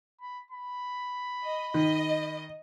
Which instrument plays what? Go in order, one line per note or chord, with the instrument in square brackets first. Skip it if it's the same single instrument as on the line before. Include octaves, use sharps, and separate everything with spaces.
[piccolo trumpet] B5
B5
[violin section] D#5
[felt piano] D#3 [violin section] D#5